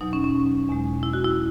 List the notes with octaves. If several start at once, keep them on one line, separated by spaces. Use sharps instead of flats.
E2 B2 F#3 D#4
C#4
C#4
E2 B2 G#3
E4
F#4
E4